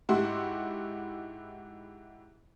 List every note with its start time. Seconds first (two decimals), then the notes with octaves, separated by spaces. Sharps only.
0.09 G#2 E4 F#4 G4 C6